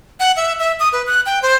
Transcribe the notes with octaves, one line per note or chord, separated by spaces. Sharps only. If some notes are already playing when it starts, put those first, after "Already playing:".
F#5
E5
E5
D#6
B4
F#6
G5
C5